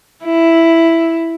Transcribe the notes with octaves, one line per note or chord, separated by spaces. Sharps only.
E4